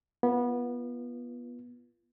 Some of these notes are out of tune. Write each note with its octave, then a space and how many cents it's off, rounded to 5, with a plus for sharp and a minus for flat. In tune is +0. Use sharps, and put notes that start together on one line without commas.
B3 -20 F4 -25